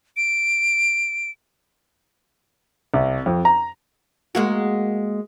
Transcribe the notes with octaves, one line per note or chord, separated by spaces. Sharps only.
D7
C2
F2
A#5
G#3 A#3 F#4